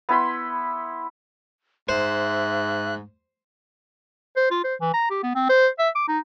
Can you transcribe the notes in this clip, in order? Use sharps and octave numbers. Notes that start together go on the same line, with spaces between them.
B3 E4 B5 C6
G#2 C5 E5 F#6
C5
F4
C5
E3
A#5
G4
B3
C4
C5
E5
D6
D#4